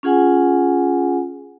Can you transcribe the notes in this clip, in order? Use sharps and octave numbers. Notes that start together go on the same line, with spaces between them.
C#4 F4 G#4 F#5 G#5